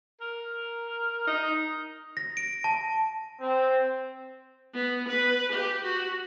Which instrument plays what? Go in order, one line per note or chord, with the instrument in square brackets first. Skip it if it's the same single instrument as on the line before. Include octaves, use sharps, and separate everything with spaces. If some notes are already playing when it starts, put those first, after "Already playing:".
[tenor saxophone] A#4
D#4
[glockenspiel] A#6
D7
A5
[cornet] C4
[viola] B3
B4
G4
F#4